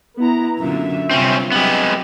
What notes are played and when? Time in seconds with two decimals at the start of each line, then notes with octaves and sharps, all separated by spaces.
0.18 B3 E4 A#5
0.59 F#2 A#2 D3 E5
1.11 G2 C3 C4 C#4 F4
1.52 F#3 G#3 B3 C4 G4